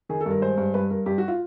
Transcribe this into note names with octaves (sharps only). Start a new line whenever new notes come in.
D#3 G#4
A4
G2 A#4
G#3 C5
G2
G2 B4
G2 A#4
G2 G4
F#4
F4